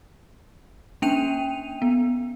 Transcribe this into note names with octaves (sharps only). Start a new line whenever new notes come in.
A#3 C#4 D4 G5 D#7 F7
B3